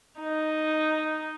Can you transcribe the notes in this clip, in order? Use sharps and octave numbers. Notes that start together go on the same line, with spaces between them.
D#4